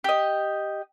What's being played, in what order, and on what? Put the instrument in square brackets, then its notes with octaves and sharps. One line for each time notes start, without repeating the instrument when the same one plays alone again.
[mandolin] G4 D#5